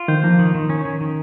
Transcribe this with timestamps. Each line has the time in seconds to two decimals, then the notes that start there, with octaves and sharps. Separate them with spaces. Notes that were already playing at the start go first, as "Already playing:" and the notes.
Already playing: F4
0.08 D#3 C5
0.24 F3 A#3
0.39 D#3
0.55 D#3
0.70 C#4
0.85 D#3
1.01 D#3